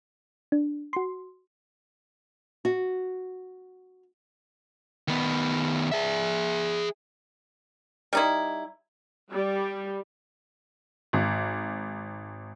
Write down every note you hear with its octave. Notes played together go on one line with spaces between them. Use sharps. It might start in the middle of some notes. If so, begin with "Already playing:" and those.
D4
F#4 C6
F#4
D#3 B3
G#4 E5
G3 D#4 E4
G3
G#1